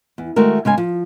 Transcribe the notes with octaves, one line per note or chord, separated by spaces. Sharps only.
E2
D#3 G#3 A3 F#4 A#4
C#3 G#3 F5 G#5
F3